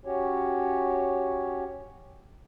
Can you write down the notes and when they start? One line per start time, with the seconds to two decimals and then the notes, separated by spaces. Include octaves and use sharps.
0.05 C#4 F#4 G4 C#5